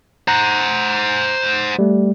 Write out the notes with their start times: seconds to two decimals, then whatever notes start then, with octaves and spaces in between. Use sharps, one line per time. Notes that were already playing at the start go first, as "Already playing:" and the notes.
0.28 C5 F#5 A#5
1.79 G3 A3